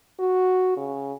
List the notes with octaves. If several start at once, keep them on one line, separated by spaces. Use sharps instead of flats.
F#4
C#3